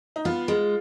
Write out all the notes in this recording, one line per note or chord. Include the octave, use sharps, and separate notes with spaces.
D#4
B3 F4
G#3